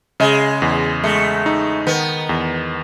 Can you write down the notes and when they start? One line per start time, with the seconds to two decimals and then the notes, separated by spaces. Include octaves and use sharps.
0.20 C#3 G#3
0.62 E2
1.04 G#3 A3
1.46 D#4
1.87 D#3 B3
2.29 E2